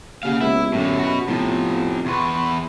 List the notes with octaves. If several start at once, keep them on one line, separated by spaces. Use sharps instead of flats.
C#3 A#3 G4 F5 F#5
C#2 B3 E4 G4 E5
F#2 A2 D3
F#4 B4
A2 C3 F3 B3
E2 B4 C6 C#6